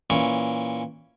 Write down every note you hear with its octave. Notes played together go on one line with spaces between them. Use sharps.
A#2 E3 C#4